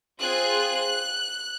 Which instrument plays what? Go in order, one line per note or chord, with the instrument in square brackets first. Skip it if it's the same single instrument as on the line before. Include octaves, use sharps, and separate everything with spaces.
[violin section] C4 F4 G#4 F#6